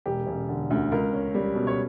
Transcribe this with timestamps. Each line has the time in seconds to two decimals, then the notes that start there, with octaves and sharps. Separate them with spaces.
0.06 E1 G4
0.27 E1
0.49 D3
0.70 D2
0.92 C#2 A#4
1.13 C#4
1.34 G3
1.55 B2
1.67 C#5